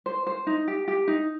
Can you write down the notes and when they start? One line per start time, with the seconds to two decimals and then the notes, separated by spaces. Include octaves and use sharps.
0.06 C5
0.27 C5
0.47 D#4
0.68 G4
0.88 G4
1.08 D#4